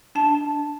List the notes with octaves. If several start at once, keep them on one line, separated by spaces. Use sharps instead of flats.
D4 A5
D4